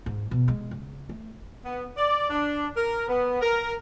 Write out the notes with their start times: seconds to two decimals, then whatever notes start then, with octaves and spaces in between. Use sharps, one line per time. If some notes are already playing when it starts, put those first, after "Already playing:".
0.06 G#2
0.31 B2
0.48 G#3
0.71 C#3
1.09 A3
1.64 B3
1.97 D5
2.30 D4
2.75 A#4
3.08 B3
3.41 A#4